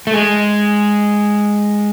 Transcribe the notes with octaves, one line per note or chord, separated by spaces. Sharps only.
A3
G#3